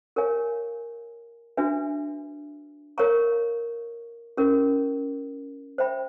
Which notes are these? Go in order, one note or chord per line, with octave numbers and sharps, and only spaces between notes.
G4 A#4 C#5 F5 G#5
D4 F#4 B4 E5 G#5
A#4 C#5 F5 A#5 C#6
C#4 E4 G4 A#4
C5 E5 G5 B5